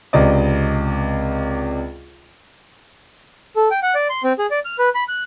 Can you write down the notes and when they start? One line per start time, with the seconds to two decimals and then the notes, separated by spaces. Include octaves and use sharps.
0.13 C#2 C3 D5 D#5
3.56 A4
3.71 G5
3.83 F#5
3.95 D5
4.10 C6
4.24 C4
4.39 G#4
4.51 D5
4.65 F6
4.79 B4
4.95 B5
5.09 F#6